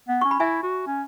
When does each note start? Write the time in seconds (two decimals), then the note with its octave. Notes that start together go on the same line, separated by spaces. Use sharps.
0.08 B3
0.21 C#4 C#6
0.31 B5
0.40 E4 E5 G#5
0.63 F#4
0.87 C#4